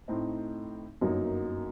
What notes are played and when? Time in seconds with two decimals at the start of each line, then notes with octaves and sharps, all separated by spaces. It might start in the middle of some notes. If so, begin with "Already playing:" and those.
0.08 A2 A3 C4 D#4
1.01 G1 F#2 F#3 A#3 D#4